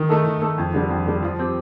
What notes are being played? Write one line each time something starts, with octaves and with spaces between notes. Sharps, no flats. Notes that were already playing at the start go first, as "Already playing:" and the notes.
Already playing: D#3
A3 D#4 A4
D#3
A3 D#4 A4
F2
D3 G3
F2
D3 G3
F3
C4 G4